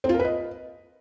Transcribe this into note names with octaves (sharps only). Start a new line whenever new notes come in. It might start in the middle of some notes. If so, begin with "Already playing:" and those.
C4
F4
A#4
B4
D#5